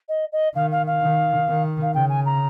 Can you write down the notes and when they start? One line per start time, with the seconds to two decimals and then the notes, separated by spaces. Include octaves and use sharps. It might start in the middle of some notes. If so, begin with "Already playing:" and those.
0.08 D#5
0.32 D#5
0.54 D#3 F5
0.71 F5
0.86 F5
1.01 D#3
1.48 D#3
1.82 F5
1.94 C#3 G5
2.09 G#5
2.25 A#5